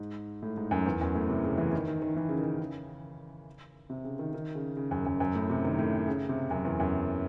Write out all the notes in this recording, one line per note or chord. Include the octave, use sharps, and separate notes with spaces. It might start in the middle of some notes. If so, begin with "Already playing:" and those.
Already playing: G#2
A2
G#2
F#2
E2
F#2
A2
C3
C#3
E3
D#3
D#3
D#3
E3
C#3
D#3
C#3
C3
C#3
D#3
D#3
C#3
C#3
F#2
F#2
F#2
A2
C3
D#3
A2
C#3
C3
F#2
E2
F#2